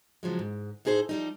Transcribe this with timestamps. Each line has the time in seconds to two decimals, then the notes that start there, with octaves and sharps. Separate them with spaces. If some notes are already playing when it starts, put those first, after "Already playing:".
0.23 C#3 F3 F#3 G#3
0.39 G#2
0.85 A2 D#4 G#4 A#4 C5
1.09 F3 G3 D#4